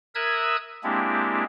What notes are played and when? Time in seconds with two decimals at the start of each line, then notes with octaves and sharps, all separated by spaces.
0.15 A#4 E5 D#6 E6 F#6 G#6
0.84 G#3 A#3 C4 D4 E4 G4